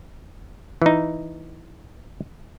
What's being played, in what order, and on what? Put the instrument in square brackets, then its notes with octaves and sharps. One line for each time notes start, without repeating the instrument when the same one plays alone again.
[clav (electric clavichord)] E3 D#4